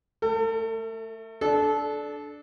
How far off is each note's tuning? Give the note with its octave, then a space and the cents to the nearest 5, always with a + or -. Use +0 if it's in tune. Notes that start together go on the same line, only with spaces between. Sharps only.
A3 +0 A4 +40
D4 +0 A4 -25